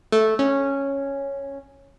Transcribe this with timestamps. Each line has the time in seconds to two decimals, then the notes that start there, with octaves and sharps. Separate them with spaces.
0.12 A3
0.39 C#4